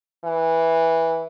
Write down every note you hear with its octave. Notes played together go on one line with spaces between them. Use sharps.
E3